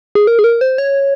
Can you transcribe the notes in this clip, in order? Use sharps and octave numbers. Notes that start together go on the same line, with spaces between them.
G#4
A#4
G#4
A#4
C5
C#5